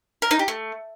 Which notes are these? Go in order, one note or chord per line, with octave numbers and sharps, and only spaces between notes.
A#4
D#4
G4
A3